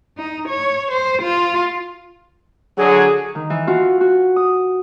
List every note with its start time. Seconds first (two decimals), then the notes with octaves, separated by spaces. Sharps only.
0.17 D#4
0.48 C#5
0.91 C5
1.22 F4
2.77 D3 F#3 G#4
3.35 D#3
3.50 E3
3.67 F4 F#4
4.01 F#4
4.36 D#6